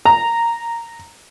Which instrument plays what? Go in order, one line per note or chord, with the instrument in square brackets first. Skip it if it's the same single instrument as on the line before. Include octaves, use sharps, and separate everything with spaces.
[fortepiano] A#5